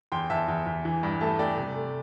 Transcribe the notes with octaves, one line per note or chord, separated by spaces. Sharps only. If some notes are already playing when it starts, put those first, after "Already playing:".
E2 G5 C6
E2 E5 A5
E2
E2
E3
G2
A3 E5 A5
A3 D5 G5
C3
A3